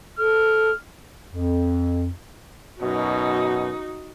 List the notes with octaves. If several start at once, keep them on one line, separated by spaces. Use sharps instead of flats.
A4 F6
F2
F#2 B2 D#4 F#4